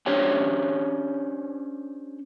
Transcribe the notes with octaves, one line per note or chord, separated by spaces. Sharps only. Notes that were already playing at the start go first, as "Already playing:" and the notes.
C#4 D4 G4 C5 C#5 G5